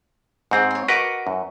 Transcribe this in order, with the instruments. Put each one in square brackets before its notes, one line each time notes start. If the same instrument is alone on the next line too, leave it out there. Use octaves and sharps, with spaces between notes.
[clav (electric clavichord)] G#2 C4 [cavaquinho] G#4 F#5 C#6
[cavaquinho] C#5 C6
[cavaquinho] F#4 C#6 D6 [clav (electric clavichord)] A#4 B4 D#5
[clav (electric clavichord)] F#2